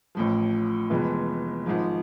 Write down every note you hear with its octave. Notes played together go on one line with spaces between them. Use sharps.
A1 A2 F3
F1 F2 E3 G#3 B3
G#1 G#2 F3